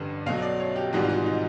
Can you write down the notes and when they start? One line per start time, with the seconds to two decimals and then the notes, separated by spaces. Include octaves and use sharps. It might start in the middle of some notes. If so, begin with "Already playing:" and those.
Already playing: A1 G2 D3 G3 B4
0.26 B1 B2 F#3 F5
0.42 D5
0.60 C#5
0.76 G4
0.93 G#1 G#2 E3 G3 F#4
1.04 F4
1.09 F#4
1.26 D#4